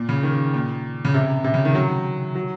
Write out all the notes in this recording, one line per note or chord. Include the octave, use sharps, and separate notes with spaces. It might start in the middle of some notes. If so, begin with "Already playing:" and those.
Already playing: A#2
C#3
D#3
A#2
C#3
C3
C3
C#3
D#3
F#3
F#3